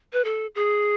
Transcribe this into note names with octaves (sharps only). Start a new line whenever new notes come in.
B4
A4
G#4